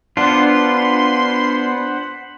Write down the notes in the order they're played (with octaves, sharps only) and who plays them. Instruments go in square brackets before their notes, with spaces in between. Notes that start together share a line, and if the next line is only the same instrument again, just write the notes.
[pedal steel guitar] B3 F4 [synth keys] D4 [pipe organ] C5 F#5 B5 [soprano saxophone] C6